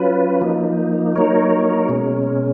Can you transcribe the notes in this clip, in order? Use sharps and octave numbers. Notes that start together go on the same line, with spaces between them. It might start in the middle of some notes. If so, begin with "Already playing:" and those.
Already playing: F#3 C#4 F4 B4
F3 A#3 D#4
F#3 A#3 D#4 A#4 C#5
B2 G#3 C#4